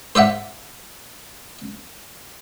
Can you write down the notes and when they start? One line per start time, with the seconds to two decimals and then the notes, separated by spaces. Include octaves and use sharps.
0.15 C5 D5 E5 F#5